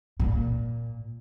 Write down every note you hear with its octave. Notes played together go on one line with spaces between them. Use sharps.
A#2